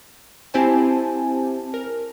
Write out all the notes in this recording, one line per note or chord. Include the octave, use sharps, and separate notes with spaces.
C4 E4 G4 C5 G#5 A5
A#4